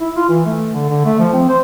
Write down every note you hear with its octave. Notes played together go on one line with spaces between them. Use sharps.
E4
F4
E3
A3
D3
D3
A3
F3
C4
C5